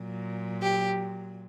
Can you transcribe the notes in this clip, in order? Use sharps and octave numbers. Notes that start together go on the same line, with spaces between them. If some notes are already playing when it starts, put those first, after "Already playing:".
Already playing: A#2 F#3
G4